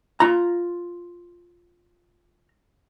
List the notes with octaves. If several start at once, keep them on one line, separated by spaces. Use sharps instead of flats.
F4 A#5